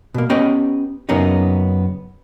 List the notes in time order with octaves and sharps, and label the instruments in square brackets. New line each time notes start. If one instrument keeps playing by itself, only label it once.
[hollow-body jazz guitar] B2 A#3
B3 C#4 G4 B4 D#5 G5
F#2 C#3 A#3 B3 C#4 D#4